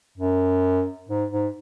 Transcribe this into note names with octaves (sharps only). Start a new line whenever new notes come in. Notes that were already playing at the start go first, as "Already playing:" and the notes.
F#2
G#2
G#2